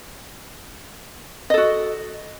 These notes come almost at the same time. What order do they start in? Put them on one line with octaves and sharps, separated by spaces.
D#5 A4 F#4